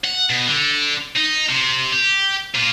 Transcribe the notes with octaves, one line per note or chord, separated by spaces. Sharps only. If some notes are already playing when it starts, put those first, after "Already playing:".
F#5
B2
D3
D#4
C3
G4
A#2